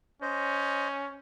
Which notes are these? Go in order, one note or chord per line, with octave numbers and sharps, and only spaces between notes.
C#4 C5 D#5